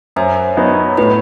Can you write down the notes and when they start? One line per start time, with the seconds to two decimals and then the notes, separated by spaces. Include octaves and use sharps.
0.16 F#2 C5 E5
0.57 F#3 B3 D#4
0.97 A2 B4 D#5